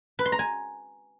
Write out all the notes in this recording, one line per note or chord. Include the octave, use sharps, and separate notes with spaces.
B4
C6
A#5
G#5